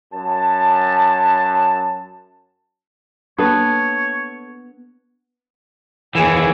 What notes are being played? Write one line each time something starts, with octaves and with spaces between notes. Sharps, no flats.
F#2 A5
A#3 B3 D4 A4 C#5
D#2 E3 G#4